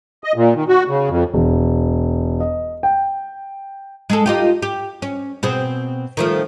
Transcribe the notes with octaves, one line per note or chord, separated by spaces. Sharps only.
D#5
A#2
D#3
F#4
C#3
F2
E1
D#5
G5
G#3 G#4 A4
D#4 F4 G4
G4
C#4
B2 C4 G#4
D#3 F3 A3